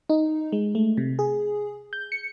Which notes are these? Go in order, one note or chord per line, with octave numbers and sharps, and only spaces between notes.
D#4
G#3
A3
C3
G#4
G6
C#7